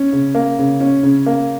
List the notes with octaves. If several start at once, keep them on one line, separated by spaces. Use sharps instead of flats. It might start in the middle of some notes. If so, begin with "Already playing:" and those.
Already playing: C#4
C#3
A#3
C#3
C#4
C#3
A#3